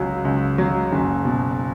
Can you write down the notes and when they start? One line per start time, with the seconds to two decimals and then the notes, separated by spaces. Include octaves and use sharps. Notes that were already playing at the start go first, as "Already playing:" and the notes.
Already playing: C#2 F#3
0.25 C#2
0.58 F#3
0.92 F#1
1.25 B2